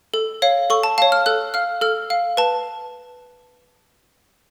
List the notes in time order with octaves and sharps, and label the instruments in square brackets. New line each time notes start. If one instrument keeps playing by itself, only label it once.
[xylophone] A4
C#5 F5
A4 C#6
A5
C#5 F5 A5
F6
A4 F#6
F5 F6
A4 F6
F5
B4 A5